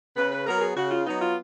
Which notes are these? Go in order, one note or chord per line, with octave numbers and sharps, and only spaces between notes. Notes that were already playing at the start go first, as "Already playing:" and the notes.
C#3 B4
B4
F#3 B3 A#4
G#4
C#3 F#4
F4
F#3 B3 D#4
F4